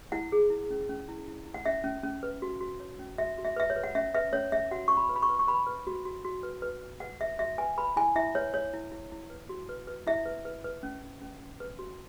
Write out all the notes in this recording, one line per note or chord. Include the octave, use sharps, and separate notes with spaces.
E4 F#5
G#4
E4
C#4
C#4
E4
E4
E4
F#5
C#4 E5
C#4
C#4
B4
F#4
F#4
C#5
C#4
F#4 E5
F#4
E5
B4 E5
C#5
B4
F#5
C#4 E5
B4 E5
C#4 C#5
C#4 E5
F#4 F#5
C#4 C#6
B5
B4
B5
C#6
B4
C#6
B4 B5
B4
F#4
F#4
F#4
B4
B4
B4
B4 F#5
B4 E5
F#4 E5
B4 G#5
B4 B5
E4 G#5
E4 E5
B4 C#5
C#5
E4
E4
E4
B4
F#4
B4
B4
E4 E5
B4
B4
B4
C#4
C#4
C#4
C#4
B4
F#4